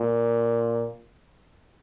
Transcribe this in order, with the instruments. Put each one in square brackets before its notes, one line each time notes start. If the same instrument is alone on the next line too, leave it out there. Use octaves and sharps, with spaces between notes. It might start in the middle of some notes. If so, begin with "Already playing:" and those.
Already playing: [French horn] A#2